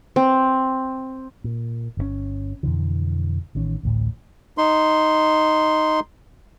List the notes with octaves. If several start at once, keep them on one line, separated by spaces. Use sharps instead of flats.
C4
A#2
G1 C3 C#4
F2 B2 D3 E3
A1 D#3 C#4
A1 D2 A2
D#4 C6